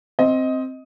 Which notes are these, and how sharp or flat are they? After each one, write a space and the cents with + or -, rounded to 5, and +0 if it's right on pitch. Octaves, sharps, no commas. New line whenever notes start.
C4 +0 D#5 +10